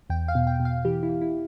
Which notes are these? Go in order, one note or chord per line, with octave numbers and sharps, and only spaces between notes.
E2 G5
F5
B2
G5
B2
F5
E3 G4
E4
E3
E4